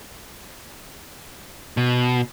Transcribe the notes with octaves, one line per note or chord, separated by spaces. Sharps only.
B2